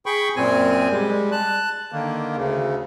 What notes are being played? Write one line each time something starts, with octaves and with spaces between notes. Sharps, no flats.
G#4 G5 B5 C#6
F#2 A#2 C4 G#5
G3 G#3
A5 F#6
D3 D#3 A#3
D2 C#3